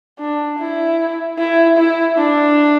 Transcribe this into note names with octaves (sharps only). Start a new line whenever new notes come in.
D4
E4
E4
E4
D4